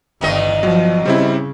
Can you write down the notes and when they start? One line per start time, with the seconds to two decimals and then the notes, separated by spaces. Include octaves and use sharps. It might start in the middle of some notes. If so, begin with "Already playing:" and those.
0.21 G1 E2 D#3 D#5
0.63 F3 F#3
1.05 C#3 G3 C4 E4